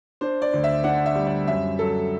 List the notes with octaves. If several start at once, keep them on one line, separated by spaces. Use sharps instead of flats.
D4 C5
D5
D2
E5
D4 F#5
E5
G3
D5
F#2 E5
F#3 A4